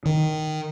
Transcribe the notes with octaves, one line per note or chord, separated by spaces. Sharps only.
D#3